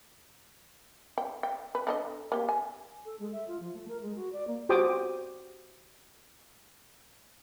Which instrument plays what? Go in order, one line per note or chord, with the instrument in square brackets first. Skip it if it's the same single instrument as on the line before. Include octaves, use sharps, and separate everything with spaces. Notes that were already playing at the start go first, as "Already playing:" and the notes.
[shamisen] G5
G5
B4
D3 D4 D#5
A#3 G4
G#5
[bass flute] A4
G#3
E5
F4
F3
A3
A#4
G#3
F#4
D5
A#3
[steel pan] F#4 G4 C5 G5 D6 D#6